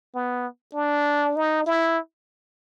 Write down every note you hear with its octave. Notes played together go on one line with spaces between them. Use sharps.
B3
D4
D#4
E4